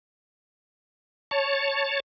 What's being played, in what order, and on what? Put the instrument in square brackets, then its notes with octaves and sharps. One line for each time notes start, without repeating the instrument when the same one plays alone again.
[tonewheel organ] C#5 A5